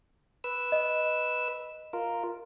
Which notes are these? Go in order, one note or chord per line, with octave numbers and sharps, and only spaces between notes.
B4 E6
D#5
F4 A#4